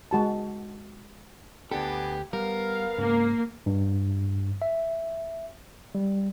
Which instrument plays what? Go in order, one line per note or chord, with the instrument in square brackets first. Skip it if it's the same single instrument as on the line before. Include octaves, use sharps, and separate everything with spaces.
[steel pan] G#3 F#4 A5
[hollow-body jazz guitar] D2 A4 [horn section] B3 D4 G#5 [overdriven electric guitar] G4
[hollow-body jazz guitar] G3 [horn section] B3 F5 [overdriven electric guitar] A#4
[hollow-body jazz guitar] G#2 C#3 [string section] A#3
[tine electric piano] G2
E5
G3